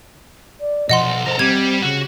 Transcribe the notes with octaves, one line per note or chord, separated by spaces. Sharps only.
D5
B1 F3 D#5 F#5 C6
A4 A#4 C5
G3 C4 G#6
C#3 F#4